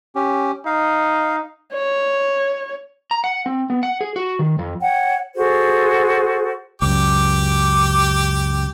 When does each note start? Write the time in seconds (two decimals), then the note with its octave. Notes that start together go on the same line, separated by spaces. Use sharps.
0.15 C#4 G4
0.66 D#4 F5
1.74 C#5
3.11 A#5
3.24 F#5
3.46 C4
3.70 B3
3.83 F#5
4.01 G#4
4.16 F#4
4.39 D#3
4.59 F2
4.80 C#5 F#5 G5
5.35 F#4 G#4 A4 C5
6.82 C#2 F#2 G4 D6